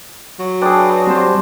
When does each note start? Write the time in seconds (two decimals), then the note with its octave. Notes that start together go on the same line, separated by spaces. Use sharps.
0.39 F#3
0.62 D4 G#4 B4 G5
1.07 G3 C4 C5 A5 C6